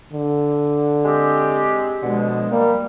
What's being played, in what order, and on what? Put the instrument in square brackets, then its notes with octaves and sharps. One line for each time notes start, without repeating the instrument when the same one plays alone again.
[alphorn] D3
[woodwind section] G#3 C4 G4
[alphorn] B2 [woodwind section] D3 F3 G#3
[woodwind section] G3 [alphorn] A#3